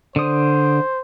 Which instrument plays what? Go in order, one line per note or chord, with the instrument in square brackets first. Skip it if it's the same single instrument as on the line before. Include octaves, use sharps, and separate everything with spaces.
[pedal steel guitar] D3 D#6 [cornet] C5